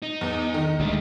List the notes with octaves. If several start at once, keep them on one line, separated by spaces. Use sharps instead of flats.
D#4
E2
D#3
D2 G3 G#3